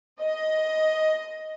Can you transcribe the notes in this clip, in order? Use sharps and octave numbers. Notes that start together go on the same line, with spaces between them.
D#5